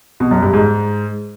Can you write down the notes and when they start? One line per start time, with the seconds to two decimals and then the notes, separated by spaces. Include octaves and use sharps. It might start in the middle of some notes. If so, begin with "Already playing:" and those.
0.20 B2
0.31 F#2
0.42 G2
0.53 G#2